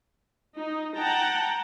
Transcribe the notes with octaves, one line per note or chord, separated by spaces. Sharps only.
D#4
F#5 G5 A5 A#5